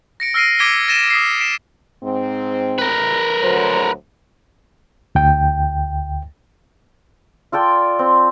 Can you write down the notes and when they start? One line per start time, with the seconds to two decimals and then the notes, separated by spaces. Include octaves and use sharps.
0.20 A#6 C#7 D7
0.34 E6 F6 A#6 C7 D7 D#7
0.59 D6 G#6 B6 D7 D#7 G7
0.88 A6 A#6 D#7 E7 G7
1.10 D#6 B6 C7
1.39 B6 C7 D7 E7
2.03 G#2 C4
2.79 A#4 B4
3.43 D2 F#3 C5
5.15 D2 G5
7.52 F4 A4 D5 G5
7.99 C4